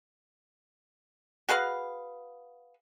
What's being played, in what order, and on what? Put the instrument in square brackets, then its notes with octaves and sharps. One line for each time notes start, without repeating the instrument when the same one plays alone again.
[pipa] F#4 G#4 B4 F5